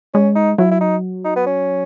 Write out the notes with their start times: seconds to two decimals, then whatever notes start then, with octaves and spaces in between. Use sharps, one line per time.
0.14 G#3 C#4
0.36 D#4
0.58 F#3 E4
0.71 E4
0.81 D#4
1.25 D#4
1.36 B3
1.47 C#4